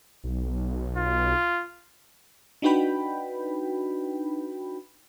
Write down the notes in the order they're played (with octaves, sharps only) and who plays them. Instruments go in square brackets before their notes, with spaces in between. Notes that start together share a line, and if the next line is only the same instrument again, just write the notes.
[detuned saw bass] B1
[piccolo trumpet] F4
[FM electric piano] D4 D#4 F#4 B4 G5 B5